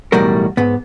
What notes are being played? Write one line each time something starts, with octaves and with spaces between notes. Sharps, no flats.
B1 E2 A2 G3 F#4 A#4
G#2 B3